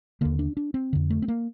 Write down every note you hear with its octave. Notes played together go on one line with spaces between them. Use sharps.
D#2 D3 A#3
D4
D4
C4
F2 D3
A3
C4
A#3